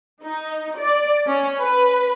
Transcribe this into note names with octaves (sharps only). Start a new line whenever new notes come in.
D#4
D5
C#4
B4